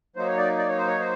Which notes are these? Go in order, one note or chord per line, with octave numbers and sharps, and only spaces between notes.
F#3 A#3 D#4 C5
C#5
D5
D5
C#5
C5
C#5
C5